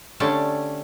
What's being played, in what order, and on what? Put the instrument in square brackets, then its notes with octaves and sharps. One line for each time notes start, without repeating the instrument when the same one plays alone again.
[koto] D3 A3 C#4 G4 A5